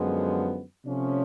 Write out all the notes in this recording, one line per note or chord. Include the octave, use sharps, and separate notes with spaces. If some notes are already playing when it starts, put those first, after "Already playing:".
Already playing: F#2 D3 F3 G#3 B3
C3 F3 A3 C#4